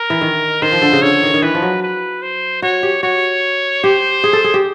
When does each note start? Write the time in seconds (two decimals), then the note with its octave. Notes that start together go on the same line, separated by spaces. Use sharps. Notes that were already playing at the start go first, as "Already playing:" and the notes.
Already playing: A#4
0.10 E3
0.21 D#3
0.62 D#3 C5
0.72 F3
0.82 D3
0.93 C#3
1.02 D3 C#5
1.23 D#3
1.34 D#3
1.42 E3 B4
1.54 F3
1.62 F#3
1.83 B4
2.22 C5
2.62 F#4 C#5
2.83 G4
3.03 F#4 C#5
3.84 G4 C5
4.24 G#4
4.33 A4
4.44 G#4
4.54 G4